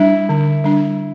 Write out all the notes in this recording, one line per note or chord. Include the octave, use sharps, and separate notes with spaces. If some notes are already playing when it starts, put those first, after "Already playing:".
Already playing: G3 D4 E4
D3
G3 D4